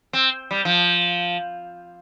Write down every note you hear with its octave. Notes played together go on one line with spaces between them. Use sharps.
C4
G3
F3